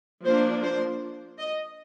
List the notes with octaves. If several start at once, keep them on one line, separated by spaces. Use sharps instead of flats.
F3 A#3 D4 C5
C5
D#5